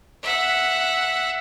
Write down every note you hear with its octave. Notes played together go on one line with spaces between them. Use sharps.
E5 F#5